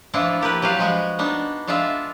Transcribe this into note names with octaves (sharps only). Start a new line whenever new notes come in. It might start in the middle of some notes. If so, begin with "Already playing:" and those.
E3 F3 D4 E4 F4
A#3 G4 A#4 B4
F#3 G4 B4 F5 A5
F3 G#3 F#4
B3 D4 D#4
G#3 D4 F4 D5 E5 F5